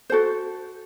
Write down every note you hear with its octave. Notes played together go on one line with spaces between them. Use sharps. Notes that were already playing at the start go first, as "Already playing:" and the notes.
F#4 A4 C5